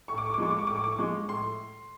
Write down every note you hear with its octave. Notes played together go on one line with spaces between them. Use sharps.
A2 C#6
D6
C#6
D6
F3 G#3 C#6
D6
C#6
A2 D6
C#6
D6
C#6
F3 G#3
A2 C6